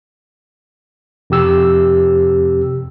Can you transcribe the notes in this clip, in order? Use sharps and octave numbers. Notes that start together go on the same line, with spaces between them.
F2 C3 G4 E6